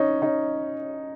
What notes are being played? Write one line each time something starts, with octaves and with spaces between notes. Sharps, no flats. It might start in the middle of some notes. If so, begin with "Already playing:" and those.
Already playing: C#4 D#4
C#4 D#4